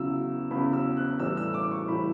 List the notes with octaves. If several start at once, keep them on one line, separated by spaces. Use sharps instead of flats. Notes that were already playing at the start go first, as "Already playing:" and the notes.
Already playing: E2 C#3 F#3 E6
E2 C#3 F#3 B5
E6
F#6
A2 E3 G3 E6
E6
D6
C#6
A2 E3 G3 B5